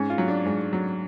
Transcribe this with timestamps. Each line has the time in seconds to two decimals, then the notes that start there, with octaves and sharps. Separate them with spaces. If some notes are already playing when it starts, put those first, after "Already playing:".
Already playing: G#2 C#4
0.10 F4
0.18 F#3
0.28 D4
0.45 G#2
0.73 F#3